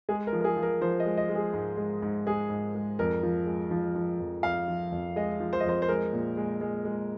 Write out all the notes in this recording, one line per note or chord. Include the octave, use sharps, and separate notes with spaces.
G#3 G#4
A#4
F3
A#4
G#4
F3
A#4
F3 C5
D#5
G#3
D#5
G#3
G#4
G#2
G#3
G#2
G#3 G#4
G#2
G#3
F2 A#4
F3
G#3
F3
F3
F2
F2 F5
F3
F2
G#3 D#5
F3
C5
D#5
F2 C5
C5
G#3 A#4
A#2
G#3
G#3
G#3